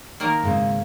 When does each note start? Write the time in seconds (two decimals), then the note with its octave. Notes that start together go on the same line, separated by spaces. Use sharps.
0.20 D#3 A#3 A#4
0.43 G#2 C#3 C4